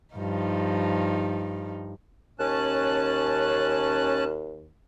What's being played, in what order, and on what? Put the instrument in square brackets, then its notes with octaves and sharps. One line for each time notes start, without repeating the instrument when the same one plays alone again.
[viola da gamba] G2 F3 D#4
[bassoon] D#2 [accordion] C#4 A5 F#6